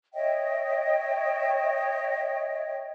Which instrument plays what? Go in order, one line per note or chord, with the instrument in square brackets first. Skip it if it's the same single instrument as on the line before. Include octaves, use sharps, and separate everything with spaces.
[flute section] C#5 D#5 E5 G5